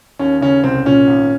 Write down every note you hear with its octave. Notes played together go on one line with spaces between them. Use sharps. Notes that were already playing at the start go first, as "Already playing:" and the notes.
D#2 C#4
C#3 C#4
C2 C4
A#2 C#4
G#1